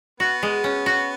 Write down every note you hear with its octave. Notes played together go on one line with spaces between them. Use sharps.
B3 F#4
G#3
C#4
F#4